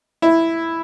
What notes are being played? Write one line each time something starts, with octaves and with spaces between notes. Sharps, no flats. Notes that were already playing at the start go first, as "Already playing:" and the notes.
E4